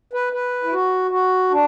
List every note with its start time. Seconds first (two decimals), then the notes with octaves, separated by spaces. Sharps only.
0.13 B4
0.33 B4
0.64 E4
0.72 F#4
1.11 F#4
1.51 D4